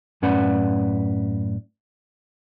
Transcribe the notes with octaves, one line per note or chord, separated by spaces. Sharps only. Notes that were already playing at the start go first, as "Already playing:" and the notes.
F#2 A2 C#4 B4 D5 F#5